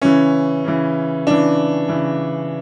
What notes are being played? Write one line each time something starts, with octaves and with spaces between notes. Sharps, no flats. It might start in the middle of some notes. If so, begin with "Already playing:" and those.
C#3 E3 C#4
C#3 E3
C#3 E3 D4
C#3 E3